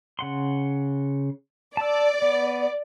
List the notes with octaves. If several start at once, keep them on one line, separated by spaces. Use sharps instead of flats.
C#3 F#5 C6
D5 A5 E6
B3